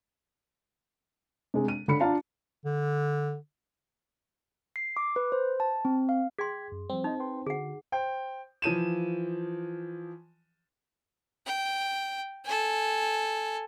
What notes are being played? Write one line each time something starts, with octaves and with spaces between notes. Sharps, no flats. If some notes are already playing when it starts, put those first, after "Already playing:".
C3 G#3
D#7
D3 B5 C#7
D4 F4 F5 A5 A#5
D3
C7
D6
B4
C5
A5
C4
F5
G#4 G5 C6 G#6 B6
F#2
F3 G3 C4
D#4 C5 D#5
B4 G5 C6
D3 F#4 G#4 F#5
C5 G5
E3 F3 D#7 E7
G5
A4 G#5